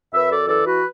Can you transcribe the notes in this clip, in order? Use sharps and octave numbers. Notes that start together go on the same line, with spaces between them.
F#2 B4 E5
A4 D5
E3 A4 D5
F#4 B4